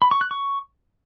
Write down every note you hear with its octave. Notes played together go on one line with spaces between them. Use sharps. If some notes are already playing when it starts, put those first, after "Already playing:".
B5
C#6
F#6
C#6